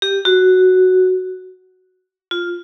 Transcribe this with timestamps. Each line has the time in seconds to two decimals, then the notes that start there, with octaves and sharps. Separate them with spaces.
0.02 G4
0.25 F#4
2.31 F4